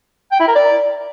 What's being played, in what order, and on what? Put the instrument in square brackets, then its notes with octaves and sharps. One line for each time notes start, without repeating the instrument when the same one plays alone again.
[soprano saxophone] G5
E4
A#4
D5